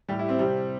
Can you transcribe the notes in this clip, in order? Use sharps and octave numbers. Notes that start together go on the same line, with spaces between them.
A2 G3 G4
E4
C4
C3 G3